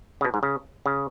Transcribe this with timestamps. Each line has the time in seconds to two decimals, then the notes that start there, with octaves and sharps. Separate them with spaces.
0.21 C#3
0.25 B2
0.34 G#2
0.43 C#3
0.86 C#3